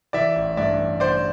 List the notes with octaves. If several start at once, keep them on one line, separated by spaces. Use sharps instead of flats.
E3 D5 E5
A1
G2 D5 E5
A1
A1 C5 D5